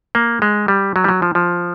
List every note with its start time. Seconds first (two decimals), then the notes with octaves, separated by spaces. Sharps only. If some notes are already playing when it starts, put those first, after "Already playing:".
0.15 A#3
0.42 G#3
0.68 G3
0.96 F#3
1.04 G3
1.09 F#3
1.22 F3
1.35 F3